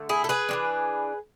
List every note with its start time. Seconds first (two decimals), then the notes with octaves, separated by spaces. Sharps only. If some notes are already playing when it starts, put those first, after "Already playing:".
Already playing: D3 A3
0.09 E4 G#4
0.24 A4
0.29 G#4 B4
0.49 E3 G#3 D4